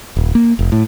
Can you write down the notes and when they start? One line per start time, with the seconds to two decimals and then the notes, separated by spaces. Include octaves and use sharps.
0.17 D#1
0.35 A#3
0.59 F1
0.72 A2